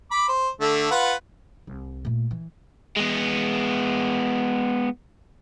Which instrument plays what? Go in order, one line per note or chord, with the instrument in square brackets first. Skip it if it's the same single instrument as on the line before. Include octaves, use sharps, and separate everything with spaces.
[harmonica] B5 D6
C5
D3 A3
F4 B4 F#5
[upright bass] C2
A#2 A3
E3
[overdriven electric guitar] G#3 B3